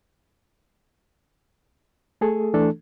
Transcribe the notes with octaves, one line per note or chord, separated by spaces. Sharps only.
A3 G#4 A4
E3 A3 D4 A4